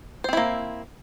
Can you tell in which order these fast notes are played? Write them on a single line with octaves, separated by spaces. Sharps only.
C5 C4 E4 A#3